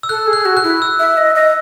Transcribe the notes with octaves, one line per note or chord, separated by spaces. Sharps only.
E6
A4 F#6
G#4
F#6
F#4
F#6
E4
E6
E5
D#5
D#5